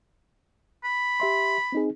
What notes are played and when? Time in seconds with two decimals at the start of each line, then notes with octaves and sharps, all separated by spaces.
0.84 B5
1.20 G4 E5 C6
1.72 C4 D#4 G#4